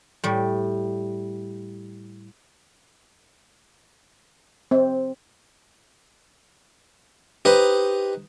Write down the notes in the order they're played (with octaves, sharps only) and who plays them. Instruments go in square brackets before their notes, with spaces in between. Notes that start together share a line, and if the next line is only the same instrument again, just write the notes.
[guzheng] A2 G3
[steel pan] C4
[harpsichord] D#4 B4 C5 [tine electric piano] G4